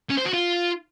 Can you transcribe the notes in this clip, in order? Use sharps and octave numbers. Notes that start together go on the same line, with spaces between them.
C#4
C5
F#4
F4